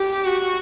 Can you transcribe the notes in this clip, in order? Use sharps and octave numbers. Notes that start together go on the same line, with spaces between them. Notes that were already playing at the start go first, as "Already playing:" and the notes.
Already playing: G4
F#4